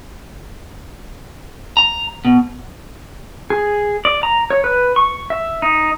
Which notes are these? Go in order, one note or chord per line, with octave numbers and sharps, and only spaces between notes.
A#5
B2
G#4
D5
A#5
C#5
B4
C#6
E5
D#4